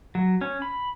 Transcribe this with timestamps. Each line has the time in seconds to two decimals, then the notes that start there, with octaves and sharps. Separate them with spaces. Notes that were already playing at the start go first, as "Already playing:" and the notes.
0.15 F#3
0.41 C#4
0.62 B5